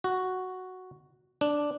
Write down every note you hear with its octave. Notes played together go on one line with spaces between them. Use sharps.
F#4
D4